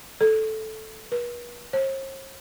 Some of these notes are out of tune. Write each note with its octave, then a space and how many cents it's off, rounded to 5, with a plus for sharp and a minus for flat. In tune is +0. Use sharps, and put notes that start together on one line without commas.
A4 -5
B4 -40
C5 +45